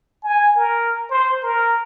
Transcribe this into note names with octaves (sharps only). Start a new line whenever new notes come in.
G#5
A#4
C5
A#4